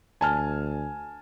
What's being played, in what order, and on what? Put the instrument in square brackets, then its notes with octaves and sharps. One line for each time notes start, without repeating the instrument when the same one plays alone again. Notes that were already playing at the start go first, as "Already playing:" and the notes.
[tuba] D2 [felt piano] G#5 A5 F6